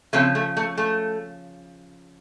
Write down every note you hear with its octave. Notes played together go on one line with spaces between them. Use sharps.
C#3 F3 A3 C4
A3
A3
A3